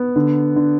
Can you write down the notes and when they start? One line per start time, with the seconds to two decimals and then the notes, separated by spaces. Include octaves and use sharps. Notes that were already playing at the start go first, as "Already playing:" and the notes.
Already playing: B3
0.16 D3
0.56 D3